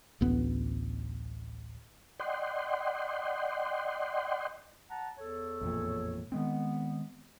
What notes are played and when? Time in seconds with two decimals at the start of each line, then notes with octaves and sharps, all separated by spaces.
0.21 A1 D2 B3
2.20 D5 D#5 F#5 G5 C6
4.89 F#5 A5 A#5
5.17 E2 A4 C#5
5.61 A1 F2 A#2
6.32 D#3 G#3 B3 C4